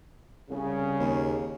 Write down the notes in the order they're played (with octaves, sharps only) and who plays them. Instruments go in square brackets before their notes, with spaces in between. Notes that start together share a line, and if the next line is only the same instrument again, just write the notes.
[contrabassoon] C2 [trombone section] C#3
[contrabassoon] D#2